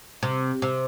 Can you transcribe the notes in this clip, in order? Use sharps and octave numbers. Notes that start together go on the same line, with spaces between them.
C3
C3